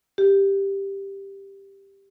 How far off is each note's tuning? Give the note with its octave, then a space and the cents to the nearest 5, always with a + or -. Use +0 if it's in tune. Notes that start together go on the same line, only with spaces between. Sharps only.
G4 +5